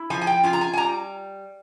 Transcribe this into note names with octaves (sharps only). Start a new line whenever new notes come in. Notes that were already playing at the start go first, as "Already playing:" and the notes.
Already playing: E4
F3 G#5
G#5
G5
F4 G#5
A#5
G#5
G#5
G3 A#5